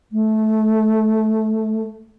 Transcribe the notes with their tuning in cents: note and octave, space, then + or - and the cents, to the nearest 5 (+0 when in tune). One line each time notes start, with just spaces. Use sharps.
A3 -15